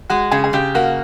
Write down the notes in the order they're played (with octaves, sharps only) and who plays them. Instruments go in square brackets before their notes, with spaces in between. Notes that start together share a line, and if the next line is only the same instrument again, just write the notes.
[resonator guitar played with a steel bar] G#3 [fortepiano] F#4
[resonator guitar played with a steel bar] C#3 [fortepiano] G#4
[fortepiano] G#4
[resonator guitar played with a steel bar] C#3 [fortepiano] G4
[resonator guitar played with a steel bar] A#3 [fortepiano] F#4